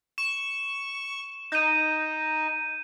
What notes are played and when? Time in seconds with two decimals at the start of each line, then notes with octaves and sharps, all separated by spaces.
0.18 C#6 E7
1.52 D#4 G6 D#7